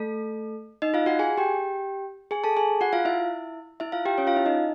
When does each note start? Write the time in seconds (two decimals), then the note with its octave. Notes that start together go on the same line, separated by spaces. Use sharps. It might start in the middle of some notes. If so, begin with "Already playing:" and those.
Already playing: A3 A4
0.82 D#4 D#5
0.94 F4 F5
1.06 F#4 F#5
1.19 G#4 G#5
1.38 G4 G5
2.31 G#4 G#5
2.44 A4 A5
2.57 G#4 G#5
2.81 F#4 F#5
2.93 F4 F5
3.05 E4 E5
3.80 E4 E5
3.92 F4 F5
4.06 G4 G5
4.18 C#4 C#5
4.27 F4 F5
4.36 E4 E5
4.46 D#4 D#5